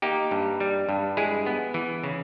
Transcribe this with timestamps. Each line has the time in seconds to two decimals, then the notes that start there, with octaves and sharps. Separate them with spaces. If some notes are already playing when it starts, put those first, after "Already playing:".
0.02 A#3 D#4 G4
0.31 G2
0.60 G3
0.89 G2
1.17 G#3 E4 G#4
1.46 B3
1.74 E3
2.04 C#3